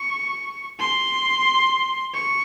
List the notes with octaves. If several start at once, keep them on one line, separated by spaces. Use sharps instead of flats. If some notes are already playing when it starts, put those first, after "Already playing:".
Already playing: C#6
C6
C#6